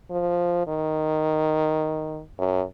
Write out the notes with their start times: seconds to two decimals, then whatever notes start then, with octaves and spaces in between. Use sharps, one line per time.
0.11 F3
0.67 D#3
2.38 F#2